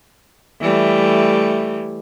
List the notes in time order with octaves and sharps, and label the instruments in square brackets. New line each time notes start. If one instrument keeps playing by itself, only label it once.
[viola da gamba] E3 G3 A3